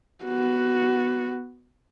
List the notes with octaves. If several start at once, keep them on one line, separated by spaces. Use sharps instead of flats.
B3 F#4